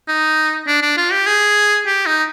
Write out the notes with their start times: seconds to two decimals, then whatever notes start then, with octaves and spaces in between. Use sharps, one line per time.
0.08 D#4
0.67 D4
0.82 D4
0.97 F4
1.12 G4
1.27 G#4
1.86 G4
2.06 D#4